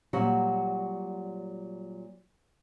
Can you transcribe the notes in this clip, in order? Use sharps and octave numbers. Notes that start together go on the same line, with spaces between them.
A#2 F#3 G3 F#4 F#5